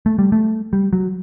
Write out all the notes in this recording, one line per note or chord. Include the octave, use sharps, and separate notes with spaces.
A3
G3
A3
G3
F#3